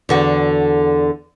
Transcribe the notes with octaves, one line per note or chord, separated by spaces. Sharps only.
E2 D3 F#4